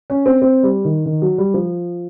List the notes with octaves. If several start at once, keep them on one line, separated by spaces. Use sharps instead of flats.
C#4
C4
C4
G3
D#3
D#3
F#3
G3
F3